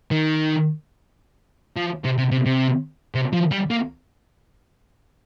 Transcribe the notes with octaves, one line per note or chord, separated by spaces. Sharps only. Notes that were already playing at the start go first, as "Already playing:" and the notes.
D#3
F3
C3
C3
C3
C3
C3
F3
G3
A#3